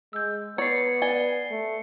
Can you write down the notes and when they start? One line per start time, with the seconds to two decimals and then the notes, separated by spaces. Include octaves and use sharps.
0.13 G#3 E6 G6
0.58 B3 C#5 D5 C7 C#7
1.02 D5 G#5 G7
1.51 A3